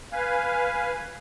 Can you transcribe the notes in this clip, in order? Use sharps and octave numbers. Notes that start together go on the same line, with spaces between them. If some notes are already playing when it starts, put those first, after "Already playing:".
B4 F5 G#5